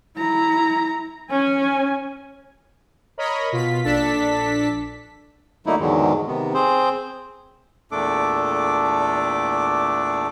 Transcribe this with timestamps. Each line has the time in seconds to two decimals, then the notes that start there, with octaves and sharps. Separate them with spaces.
0.17 E4 A#5
1.30 C#4 G#5
3.18 A#4 C#5 D#5 B5
3.52 B2 F4 B6
3.83 A#1 D4 A4 A5 B6
5.66 D3 F#3 A3 A#3 D#4 E4
5.80 E2 G#2 D3 D#3 F#3 G#3
6.27 C3 D#3 B3
6.54 C4 G#4 C5
7.92 E2 A#2 A3 D4 A4 D6